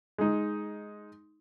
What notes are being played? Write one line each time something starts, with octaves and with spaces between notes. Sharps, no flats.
G#3 D#4